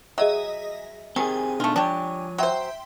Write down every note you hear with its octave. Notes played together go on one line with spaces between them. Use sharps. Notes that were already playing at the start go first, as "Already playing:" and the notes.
F#3 G#4 D#5 E5
D#3 C4 G4 G#4 G#5
B2 A3 D4 D#4 F4
F3 D4 G4 C#5
F#3 C5 E5 G5 C6